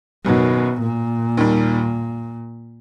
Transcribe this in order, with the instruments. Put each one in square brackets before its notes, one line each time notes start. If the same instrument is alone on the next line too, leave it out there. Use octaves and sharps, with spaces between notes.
[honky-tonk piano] F#1 F#2 D#3 F#3 [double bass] B2
[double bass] A#2
[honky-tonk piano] D#2 D#3 G3